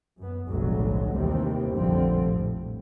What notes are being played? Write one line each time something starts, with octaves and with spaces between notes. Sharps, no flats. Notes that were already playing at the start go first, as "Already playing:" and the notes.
F#2 B3
F1 B1 A2 D3 F#3 G#3
D#2 C3 D#3 E3 G3 C4
F1 A#1 D3 F3 G3 C4
A2